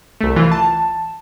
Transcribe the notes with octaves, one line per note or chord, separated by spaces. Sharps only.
C2 A3
E3 F4
A5